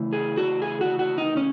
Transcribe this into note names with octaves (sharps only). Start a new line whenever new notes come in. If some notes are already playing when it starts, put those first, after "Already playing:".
Already playing: C#3 E3 A3
G#4
F#4
G#4
F#4
F#4
D#4
C#4